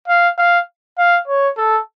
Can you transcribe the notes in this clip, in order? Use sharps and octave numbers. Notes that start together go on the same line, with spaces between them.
F5
F5
F5
C#5
A4